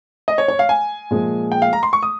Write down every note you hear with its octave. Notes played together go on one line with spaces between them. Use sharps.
D#5
C#5
C#5
F5
G#5
A#2 F3 G#3
G5
F5
A#5
C6
C#6
D#6